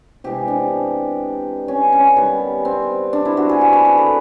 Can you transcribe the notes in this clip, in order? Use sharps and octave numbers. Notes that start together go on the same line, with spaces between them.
C3 E3 G#3 B3 G4
D4
C#4
C#4
D#3 G3 B3
C4
D4
E4
F#4
G#4
F#4
B4
B4
A4